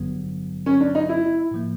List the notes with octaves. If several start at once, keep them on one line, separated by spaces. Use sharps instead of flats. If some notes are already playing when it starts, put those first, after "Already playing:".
Already playing: A1 G2 D3 F#3 B3
C#4
D4
D#4
E4
A2 F3 A#3